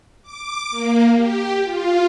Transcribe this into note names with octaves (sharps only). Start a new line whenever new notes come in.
D6
A#3
G4
F4